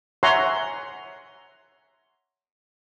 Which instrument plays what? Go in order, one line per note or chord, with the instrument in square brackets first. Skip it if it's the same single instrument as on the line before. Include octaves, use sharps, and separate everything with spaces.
[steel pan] C#5 E5 F#5 G#5 A#5 C6